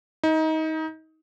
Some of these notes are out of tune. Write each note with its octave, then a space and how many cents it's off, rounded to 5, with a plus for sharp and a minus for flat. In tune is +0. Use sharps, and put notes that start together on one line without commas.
D#4 +25